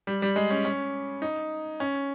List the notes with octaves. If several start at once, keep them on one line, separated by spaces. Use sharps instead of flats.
G3
G3
G#3
C#4
C#4
D#4
C#4